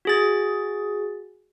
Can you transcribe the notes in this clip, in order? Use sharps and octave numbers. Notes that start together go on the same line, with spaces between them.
F#4 G#4 A6